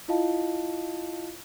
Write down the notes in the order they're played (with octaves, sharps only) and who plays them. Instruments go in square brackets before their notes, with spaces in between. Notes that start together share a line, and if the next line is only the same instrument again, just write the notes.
[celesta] E4 F4 D#5 F5 A5